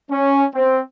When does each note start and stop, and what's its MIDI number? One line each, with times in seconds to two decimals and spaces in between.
0.10 0.44 61
0.54 0.80 60